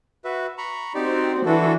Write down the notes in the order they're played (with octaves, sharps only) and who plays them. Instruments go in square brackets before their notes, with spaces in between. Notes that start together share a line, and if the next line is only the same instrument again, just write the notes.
[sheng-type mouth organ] F#4 B4 E5
A#5 B5 C#6
[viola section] C4 F#4 [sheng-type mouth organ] D#4 G4 D5
[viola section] E3 [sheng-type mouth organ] D4 F#4 A4